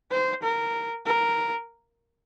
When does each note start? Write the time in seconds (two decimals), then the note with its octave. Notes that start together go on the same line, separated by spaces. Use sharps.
0.11 C5
0.43 A#4
1.06 A#4